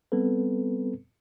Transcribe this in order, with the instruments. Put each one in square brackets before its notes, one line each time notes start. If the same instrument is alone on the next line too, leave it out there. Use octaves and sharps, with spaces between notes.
[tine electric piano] G3 B3 C4 A4 B4